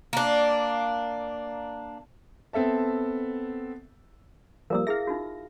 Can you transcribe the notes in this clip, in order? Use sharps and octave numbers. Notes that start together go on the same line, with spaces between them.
A#3 D4
B3 C4 A4 E5 A5
F3 G3 A#3 A#4 D#6 E6
E4 G#4 E5 F5 A#6
D#4 F4 F#4